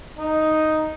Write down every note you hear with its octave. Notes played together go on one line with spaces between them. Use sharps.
D#4